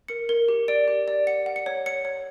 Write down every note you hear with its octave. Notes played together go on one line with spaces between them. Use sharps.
A#4 C#7
A#4
G4
D5 D7
G4
D5
F#5 C#7
F#5
C#7
C#5
C#5 C#7
C#5